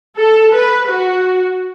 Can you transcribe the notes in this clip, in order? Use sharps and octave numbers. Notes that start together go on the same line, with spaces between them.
A4
B4
F#4